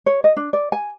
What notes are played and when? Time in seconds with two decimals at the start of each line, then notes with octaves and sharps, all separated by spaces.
0.06 C#5
0.24 D#5
0.37 D4
0.53 D5
0.72 G#5